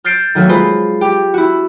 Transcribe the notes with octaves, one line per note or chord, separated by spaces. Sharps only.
F6 G6 A6 C7 D7 E7
D#3 F#3 A3 A#3
G#3 F4 B4 C5
G4
E4 F#4